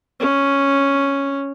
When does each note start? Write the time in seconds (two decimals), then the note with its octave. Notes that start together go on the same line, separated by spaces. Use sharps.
0.20 C#4